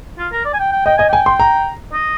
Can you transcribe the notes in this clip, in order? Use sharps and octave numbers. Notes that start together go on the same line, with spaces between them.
F4
A#4
D5
G#5
G5
G5
D#5 G5
D#5 G#5
G5 G#5
C6
A#5
D#5